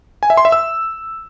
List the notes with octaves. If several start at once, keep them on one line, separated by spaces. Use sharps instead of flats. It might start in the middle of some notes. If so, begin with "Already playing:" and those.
G#5
E5
C6
E5
E6